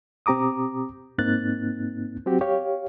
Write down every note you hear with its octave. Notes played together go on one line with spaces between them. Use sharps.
B2 C4 G4 A#5 D6 D#6
G#2 A#3 C4 D#4 F#6 A6
F#3 C4 F#4 G4
G4 C#5 F5